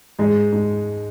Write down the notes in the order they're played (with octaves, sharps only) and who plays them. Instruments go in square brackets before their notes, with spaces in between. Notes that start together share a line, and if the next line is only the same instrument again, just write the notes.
[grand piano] G#2 G#3
G#2